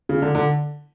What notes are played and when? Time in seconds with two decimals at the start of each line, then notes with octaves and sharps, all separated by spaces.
0.09 C#3
0.22 D3
0.35 D3